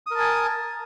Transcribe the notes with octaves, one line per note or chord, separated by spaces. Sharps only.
A#4 G#5 A5 D#6